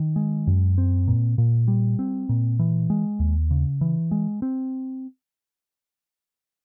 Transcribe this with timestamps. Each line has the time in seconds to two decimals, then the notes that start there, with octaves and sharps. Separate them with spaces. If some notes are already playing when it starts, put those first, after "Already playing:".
Already playing: D#3
0.16 G#3
0.47 F#2
0.78 C4
1.08 A#2
1.38 A#2
1.68 G3
1.99 C4
2.29 A#2
2.59 E3
2.90 G#3
3.20 D#2
3.51 C#3
3.81 E3
4.11 G#3
4.42 C4